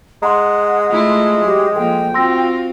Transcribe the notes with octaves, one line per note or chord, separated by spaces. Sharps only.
G#3 F#5 A#5 C6
A3 E4 F4
F#3 G4
F3 A#3 A4 G5
C4 F4 F#4 C6 E6 A#6